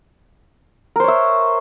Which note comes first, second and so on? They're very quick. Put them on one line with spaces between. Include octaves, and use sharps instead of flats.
A#4 C5 C#5 E5